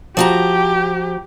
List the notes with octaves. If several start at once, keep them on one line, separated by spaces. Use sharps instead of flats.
F3 F#4 G4 A#5